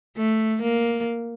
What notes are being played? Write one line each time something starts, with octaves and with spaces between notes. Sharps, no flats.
A3
A#3